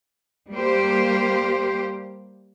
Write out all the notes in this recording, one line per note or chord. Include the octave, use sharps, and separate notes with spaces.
G3 A#3 G4 C5